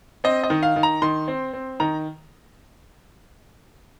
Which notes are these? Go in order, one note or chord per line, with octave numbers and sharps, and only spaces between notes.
C4 D#5
D#5
D#3
F5
D#3
A#5
D#3 C6
C4
C4
D#3 A#5